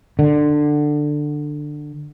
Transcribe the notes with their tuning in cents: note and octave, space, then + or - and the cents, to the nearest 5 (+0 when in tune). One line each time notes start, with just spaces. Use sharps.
D3 +15